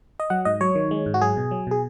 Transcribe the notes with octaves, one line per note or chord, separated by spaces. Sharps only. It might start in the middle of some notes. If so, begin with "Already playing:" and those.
D#5
F#3 F#5
G#2 D#5
F#3 C#5
D#3
G#3
G#2
F#4
F#3 G#4
B2
F#3
B2 G#4